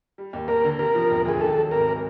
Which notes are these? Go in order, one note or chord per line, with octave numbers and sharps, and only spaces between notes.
G3
D#2
D#2 A#4
D3
C3 A#4
F3
E1
D2 G#4
D#3 A4
F#3
G#1 A#4